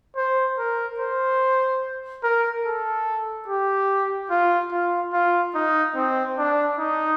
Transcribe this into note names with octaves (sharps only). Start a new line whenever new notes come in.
C5
A#4
C5
A#4
A4
G4
F4
F4
F4
D#4
C4
D4
D#4